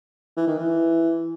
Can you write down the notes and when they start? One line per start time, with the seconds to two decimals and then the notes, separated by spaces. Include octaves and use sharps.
0.37 E3
0.47 D#3
0.58 E3